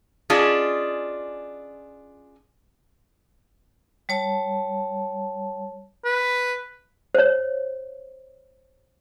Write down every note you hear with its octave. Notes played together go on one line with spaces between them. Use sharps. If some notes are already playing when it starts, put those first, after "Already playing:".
C#4 D4 F4 G#4 D#5
G3 C#5 A5
B4
C5 C#5